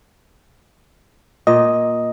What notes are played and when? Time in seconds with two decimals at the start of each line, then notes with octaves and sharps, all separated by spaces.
1.47 A#2 D#5